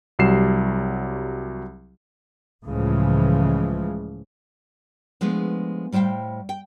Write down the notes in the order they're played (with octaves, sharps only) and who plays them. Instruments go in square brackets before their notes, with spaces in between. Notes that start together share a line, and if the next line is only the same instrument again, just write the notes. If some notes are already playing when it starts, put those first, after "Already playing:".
[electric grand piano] C2 F#3 G3 C7 E7
[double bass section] C#2 A2 C#3 E3 F3 G#3
[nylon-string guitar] F3 G#3 A3 B3 D4 B4
A2 G3 C5 F5 G5
G5